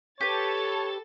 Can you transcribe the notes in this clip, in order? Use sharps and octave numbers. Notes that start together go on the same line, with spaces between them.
G4 A4 B4 C#5 A6